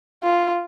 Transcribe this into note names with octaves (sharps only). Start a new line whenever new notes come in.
F4